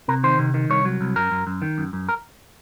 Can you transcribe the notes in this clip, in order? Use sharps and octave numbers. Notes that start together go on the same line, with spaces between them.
C3 A#4
D#3 C5
C3
D#3
C2 C#5
F#3
C2
F#2 A#4
F#2
F#2
D#3
F#2
F#2
A#4